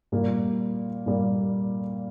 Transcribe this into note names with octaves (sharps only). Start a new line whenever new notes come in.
A#2 G3 A#3
A#2 G3 A#3